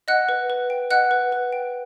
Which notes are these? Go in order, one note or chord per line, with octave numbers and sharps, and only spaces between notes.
D#5 F#5 F#6
B4
B4
G5
D#5 F#5 F#6
B4
B4
G5